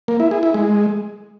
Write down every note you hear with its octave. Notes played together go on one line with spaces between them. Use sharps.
A#3
E4
G#4
E4
G#3